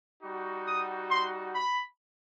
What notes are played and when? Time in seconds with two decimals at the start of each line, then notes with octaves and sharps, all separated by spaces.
0.22 G3 D#4 F#4
0.66 D#6
1.10 C6
1.54 B5